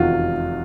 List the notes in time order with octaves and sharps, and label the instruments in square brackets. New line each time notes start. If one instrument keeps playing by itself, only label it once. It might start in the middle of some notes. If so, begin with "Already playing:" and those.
Already playing: [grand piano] F1 E2 C3 D#3 F4 F#4